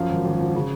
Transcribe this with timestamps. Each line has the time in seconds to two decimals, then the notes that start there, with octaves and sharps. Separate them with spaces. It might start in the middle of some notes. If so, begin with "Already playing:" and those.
Already playing: F#2 F3 F5
0.09 G#1
0.25 G#1
0.39 F3
0.55 C#3